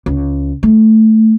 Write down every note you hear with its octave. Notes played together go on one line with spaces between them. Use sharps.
C#2
A3